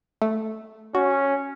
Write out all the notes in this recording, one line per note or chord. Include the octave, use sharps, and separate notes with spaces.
A3
C#4 F#4